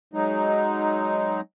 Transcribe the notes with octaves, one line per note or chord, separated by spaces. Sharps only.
F#3 G#3 D#4